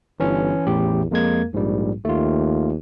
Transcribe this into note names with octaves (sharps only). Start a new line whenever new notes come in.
G1 E3 C#4
A1 E2 A2 G4
F2 G#3 A#3 G#6
A#1 G#2 G3
D#2 A3 F4